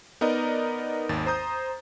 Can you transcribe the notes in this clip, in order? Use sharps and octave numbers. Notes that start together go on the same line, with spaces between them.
B3 D#4 A#4 D5 D#5 A#5
G#1 D#2 A6
C5 A#5 D#6 G6